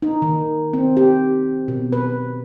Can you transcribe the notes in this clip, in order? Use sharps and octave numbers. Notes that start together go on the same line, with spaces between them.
D#4
D#3
C4
G4
B2
B4